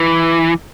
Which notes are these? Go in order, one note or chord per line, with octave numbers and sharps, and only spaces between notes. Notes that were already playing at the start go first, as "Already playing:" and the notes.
Already playing: E3